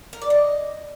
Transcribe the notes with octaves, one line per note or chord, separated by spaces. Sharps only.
A#4
D5
D#5